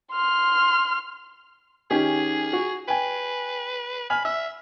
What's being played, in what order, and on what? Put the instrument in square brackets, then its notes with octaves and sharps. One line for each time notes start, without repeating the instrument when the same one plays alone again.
[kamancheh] C6 F6
[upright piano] D#3 C#4 G4 [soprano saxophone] G#4
[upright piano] F#4
[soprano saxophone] B4 [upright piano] G5 G#5
[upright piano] G#5 F6 [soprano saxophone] B5
[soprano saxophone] E5 [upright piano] E6